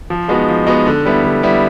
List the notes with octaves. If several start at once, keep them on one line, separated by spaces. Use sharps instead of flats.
F3
G#3 B3 D#4 F#4
F3
G#3 B3 D#4 F#4
D3
G3 B3 E4
D3
G3 B3 E4